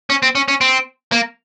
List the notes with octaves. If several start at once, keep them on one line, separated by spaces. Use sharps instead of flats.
C#4
C4
C#4
C#4
C4
A#3